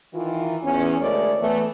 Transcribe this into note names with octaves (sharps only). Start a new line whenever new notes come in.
D#3 E3 F4
E2 C#4
D2 G#3 A3 A#4 C#5 D5
E3 A3 B3